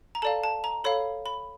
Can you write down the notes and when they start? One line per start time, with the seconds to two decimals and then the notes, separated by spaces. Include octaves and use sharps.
0.15 A#5
0.22 A4 D5 F5 A5
0.43 A5
0.64 A#5
0.84 A4 C#5 F5 B5
1.26 B5